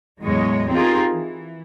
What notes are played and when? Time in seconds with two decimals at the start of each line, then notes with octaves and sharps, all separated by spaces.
0.21 E2 A2 F#3 G#3 C#5 D#5
0.70 C4 D#4 F4 G4 G#4 A#4
1.13 E3